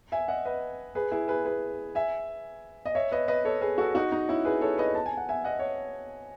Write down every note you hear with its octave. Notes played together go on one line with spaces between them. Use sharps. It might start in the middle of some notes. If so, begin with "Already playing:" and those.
E5 G#5
D#5 F#5
B4 D#5
G#4 B4
E4 G#4
G#4 B4
G#4 B4
E5 G#5
D#5
C#5 E5
B4 D#5
B4 D#5
A4 C#5
G#4 B4
F#4 A4
D#4 F#4
D#4
C#4 E4
G#4 B4
A4 C#5
B4 D#5
A5
G#5
F#5
E5 G#5
D#5 F#5
C#5